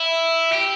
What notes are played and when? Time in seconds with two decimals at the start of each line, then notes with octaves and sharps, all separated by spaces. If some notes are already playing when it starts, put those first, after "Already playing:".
Already playing: E4
0.52 G4